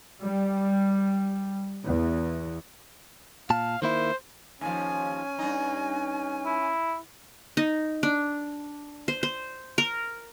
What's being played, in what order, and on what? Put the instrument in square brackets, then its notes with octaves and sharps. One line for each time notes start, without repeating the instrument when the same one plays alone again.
[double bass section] G3
E2
[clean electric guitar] A#2 A5 [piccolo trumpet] F5
[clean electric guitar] D#3 A#3 E4 [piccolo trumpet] C5
[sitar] D#2 F3 [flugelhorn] C#4 [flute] G#5
[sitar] G2 D#4
[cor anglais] E4
[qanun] D#4
D4
C5
C5
A#4